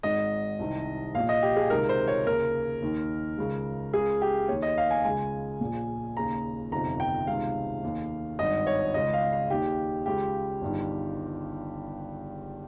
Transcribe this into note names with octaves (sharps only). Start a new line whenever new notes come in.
G#1 G#2 D#3 D#5
C2 C3 D#3
A#1 A#2 F5
D#5
G4
G#4
C#2 C3 D#3 A#4
C5
C#5
D#2 C#3 A#4
D#2 D#3
C#2 C#3
C#2 C#3 G#4
G4
D#2 D#3 C#5
D#5
F5
G#5
C#2 C#3 G#5
A#1 A#2
D#2 C#3 A#5
G1 F2 C3 D#3 A#5
G5
C#2 C3 D#3 F5
D#2 D#3
G#1 G2 D#3 D#5
C#5
C#2 C#3 D#5
F5
F5
D#2 D#3 G4
C#2 C#3 G4
G1 G2 D#3